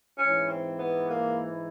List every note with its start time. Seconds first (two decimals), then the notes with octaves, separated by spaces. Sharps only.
0.18 G#2 E3 C#4
0.49 C4
0.79 B3
1.10 A#3